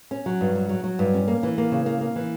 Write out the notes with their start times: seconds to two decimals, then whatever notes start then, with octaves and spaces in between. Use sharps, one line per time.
0.11 C#4
0.26 F#3
0.41 G2
0.55 F#3
0.69 F#3
0.84 F#3
0.99 G2
1.14 C#4
1.28 A#3
1.43 E3
1.58 A#3
1.72 C#3
1.86 A#3
2.01 A#3
2.16 E3